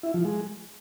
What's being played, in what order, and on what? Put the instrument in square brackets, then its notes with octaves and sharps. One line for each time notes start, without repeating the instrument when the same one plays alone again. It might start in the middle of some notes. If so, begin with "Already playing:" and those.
[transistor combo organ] E4
F3
G#3